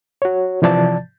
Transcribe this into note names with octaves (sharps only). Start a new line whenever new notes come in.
F#4 C#5
C3 E3 F3 D5 A5 A6